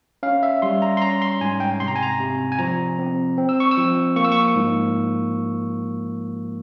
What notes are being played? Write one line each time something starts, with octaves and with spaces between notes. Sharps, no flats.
C#4 F5
E5
G3 C6
A#5
C6
C#4 A#5
C6
G#2 G#5
G5
C3 C6
A#5
G#5
A#5
C3
G#5
F3 A#5
C4
C4
E6
C#6
E6
F3
A#3 C#6
E6
C#6
G#2